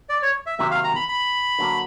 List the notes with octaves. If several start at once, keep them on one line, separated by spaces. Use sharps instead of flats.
D5
C#5
E5
C3 D#3 F#3 A#3 E5
F5
A#5
B5
B5
D3 F#3 A#3